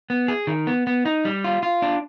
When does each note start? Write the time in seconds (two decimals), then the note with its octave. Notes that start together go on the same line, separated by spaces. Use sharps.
0.10 B3
0.28 G#4
0.47 D#3
0.67 B3
0.87 B3
1.06 D#4
1.25 G3
1.44 F4
1.63 F4
1.82 D4